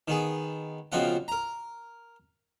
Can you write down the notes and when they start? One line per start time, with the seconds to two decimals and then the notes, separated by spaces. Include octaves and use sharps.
0.08 D#3 B3 G#4
0.92 C#2 B2 F3 C4 F4 F#5
1.28 A#4 A#5